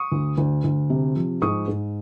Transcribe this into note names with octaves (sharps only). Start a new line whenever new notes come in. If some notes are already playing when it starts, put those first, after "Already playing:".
Already playing: C#6 D#6
D2
D2
D2
C3
F3
G#2 C#6 D#6
G#2